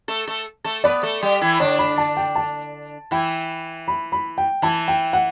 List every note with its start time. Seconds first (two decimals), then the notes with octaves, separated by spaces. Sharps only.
0.08 A3 A4
0.27 A3 A4
0.64 A3 A4
0.84 B3 B4 D5
1.03 A3 A4
1.23 G3 G4
1.41 E3 E4
1.60 D3 D4 C#5
1.79 B5
1.98 A5
2.17 G5
2.36 A5
3.11 E3 E4 G5
3.88 B5
4.12 B5
4.38 G5
4.62 E3 E4 A5
4.88 G5
5.13 F#5